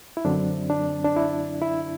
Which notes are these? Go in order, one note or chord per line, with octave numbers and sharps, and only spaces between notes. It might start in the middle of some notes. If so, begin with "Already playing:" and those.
E4
F#2 D3 F#3 C4 D4
D4
D4
E4
E4